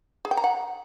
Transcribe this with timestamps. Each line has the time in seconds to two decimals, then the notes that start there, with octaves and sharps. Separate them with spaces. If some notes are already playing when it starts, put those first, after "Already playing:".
0.25 G#4
0.31 G5
0.37 A#5
0.44 F#5